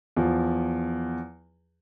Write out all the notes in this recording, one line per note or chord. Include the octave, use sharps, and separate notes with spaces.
E2 F3